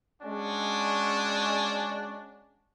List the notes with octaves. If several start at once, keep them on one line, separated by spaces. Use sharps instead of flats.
G#3 C#4 D4 F#4